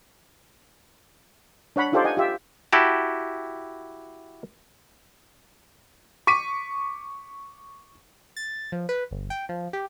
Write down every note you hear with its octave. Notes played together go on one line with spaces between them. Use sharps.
D4 C#5 F#5 B5
D#4 F4 G4 A4 C5 D5
D#5 F#5 G#5
F4 G4 E5
E4 F#4 G4 A5
C#6 D6 B6 D#7
A6
F3
B4
G1
G5
F3
G4